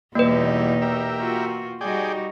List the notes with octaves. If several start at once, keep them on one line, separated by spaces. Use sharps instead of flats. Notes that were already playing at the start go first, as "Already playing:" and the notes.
E2 B2 E3 G3 A#3 D#4 B4
G4 A#4 E5
F4 F#4
G3 D#4 F#4 G#4 D5 G5